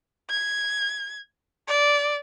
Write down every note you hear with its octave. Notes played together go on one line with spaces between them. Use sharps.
G#6
D5